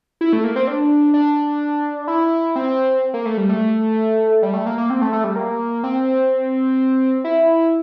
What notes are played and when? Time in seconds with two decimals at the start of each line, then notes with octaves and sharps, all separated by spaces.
0.21 E4
0.33 A3
0.44 A#3
0.56 C4
0.67 D4
1.14 D4
2.08 E4
2.56 C4
3.14 A#3
3.25 A3
3.37 G3
3.49 A3
4.42 G3
4.54 A3
4.66 A#3
4.78 A#3
4.90 C4
5.02 A3
5.13 A3
5.24 G3
5.36 A#3
5.84 C4
7.24 E4